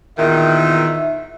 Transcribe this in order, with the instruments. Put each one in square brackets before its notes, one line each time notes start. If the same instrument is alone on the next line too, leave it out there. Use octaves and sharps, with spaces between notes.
[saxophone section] E2 A#2 D#3 [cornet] E5